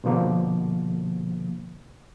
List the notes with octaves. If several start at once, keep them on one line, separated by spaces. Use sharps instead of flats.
B2 D3 F3 A#3